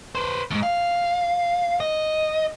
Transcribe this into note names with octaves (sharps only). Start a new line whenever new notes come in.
B4 C5
D#2 G#2
F5
D#5